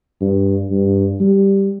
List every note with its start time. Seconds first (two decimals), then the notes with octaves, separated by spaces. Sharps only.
0.21 G2
0.71 G2
1.21 G3